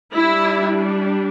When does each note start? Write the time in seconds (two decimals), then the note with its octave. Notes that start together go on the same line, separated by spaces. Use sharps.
0.16 G3 D4 E4